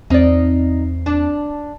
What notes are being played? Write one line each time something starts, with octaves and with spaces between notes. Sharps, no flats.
E2 C4 D#4 D5
D4